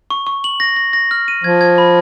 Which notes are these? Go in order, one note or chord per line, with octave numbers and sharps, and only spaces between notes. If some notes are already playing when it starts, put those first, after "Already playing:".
C#6
C#6
F#7
A#6
A#6
A#6
F6
D#7
F3 G#6
G#6
B5